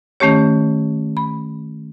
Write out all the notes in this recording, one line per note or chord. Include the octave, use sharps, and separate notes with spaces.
D#3 A3 C#4 G4 C#5
B5